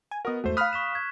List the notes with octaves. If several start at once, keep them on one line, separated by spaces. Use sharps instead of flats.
G#5
B3 F#4 A#4 D#5
E2 G#2 A3 F#4 C5
F5 B5 D#6 F6 F#6 B6
C#6 B6 E7
G#6